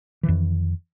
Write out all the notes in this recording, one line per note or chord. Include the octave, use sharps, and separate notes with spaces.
F2 D#3 E3